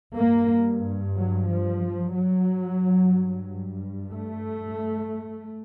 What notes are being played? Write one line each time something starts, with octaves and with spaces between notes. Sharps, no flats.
G2 A#3
F#3
F3
F#3
G2
A3